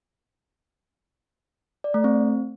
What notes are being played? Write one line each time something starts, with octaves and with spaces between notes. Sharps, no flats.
D5
A3
C4